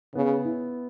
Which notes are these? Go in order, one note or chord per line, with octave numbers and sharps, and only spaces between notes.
C#3 B3
E4